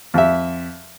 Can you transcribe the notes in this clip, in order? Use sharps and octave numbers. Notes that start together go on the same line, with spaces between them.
F2 E5